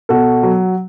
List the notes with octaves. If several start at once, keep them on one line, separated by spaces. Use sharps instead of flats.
B2 F#4 A4
F#3